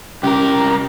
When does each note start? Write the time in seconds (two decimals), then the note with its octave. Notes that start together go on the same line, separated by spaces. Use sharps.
0.23 C2 C#4 G4 A#4